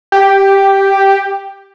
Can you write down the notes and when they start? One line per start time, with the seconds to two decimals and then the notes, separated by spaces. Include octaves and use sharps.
0.12 G4